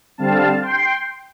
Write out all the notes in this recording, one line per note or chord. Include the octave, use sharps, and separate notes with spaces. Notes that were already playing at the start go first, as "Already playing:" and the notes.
D3 G3 C4 F5 A5
G5 C6